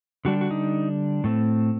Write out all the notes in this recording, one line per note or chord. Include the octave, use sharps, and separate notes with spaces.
D3 G3 D4 F#4
F#4
D#4
A2 A3 C4